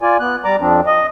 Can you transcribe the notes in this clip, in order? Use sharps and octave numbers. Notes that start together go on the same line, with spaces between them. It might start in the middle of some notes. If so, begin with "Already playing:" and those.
F4 D5 G#5
B3 F#6
G3 D5 A#5 D6
F2 F3 C4 D4
D#5